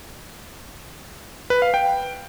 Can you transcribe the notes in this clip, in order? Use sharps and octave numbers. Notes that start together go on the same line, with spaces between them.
B4
F5
G5